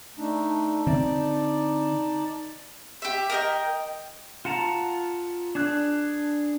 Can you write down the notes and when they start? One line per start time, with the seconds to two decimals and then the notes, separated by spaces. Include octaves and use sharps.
0.18 A3 D4 D#4
0.86 D3 C4 D#4 D5 A5
3.02 G4 E5
3.30 A#4 D#5 G5
4.45 F4 F#5 A5 A#5
5.55 D4 G#4 F#6